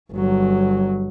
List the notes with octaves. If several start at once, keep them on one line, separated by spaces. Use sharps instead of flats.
G1 F#3